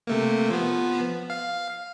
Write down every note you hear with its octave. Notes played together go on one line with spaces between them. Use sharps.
C3 A3 A#3
F3 B3
F5